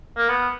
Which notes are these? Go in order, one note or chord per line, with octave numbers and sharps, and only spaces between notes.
A#3
B3